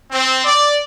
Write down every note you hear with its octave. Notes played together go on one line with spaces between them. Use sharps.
C4
D5